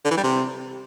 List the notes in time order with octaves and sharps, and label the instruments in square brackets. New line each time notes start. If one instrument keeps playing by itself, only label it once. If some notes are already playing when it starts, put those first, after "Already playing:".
[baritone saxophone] D3
E3
G3
C3